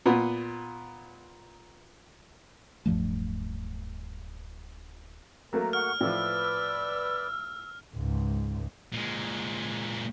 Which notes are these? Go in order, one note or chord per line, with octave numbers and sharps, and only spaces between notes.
A#2 B3
D1 G2 F3 A3
F#3 A3 A#3 A#4
F#5 C#6 F6
A2 F3 B4 D5 E6
C#2 G#2
A#2 G#3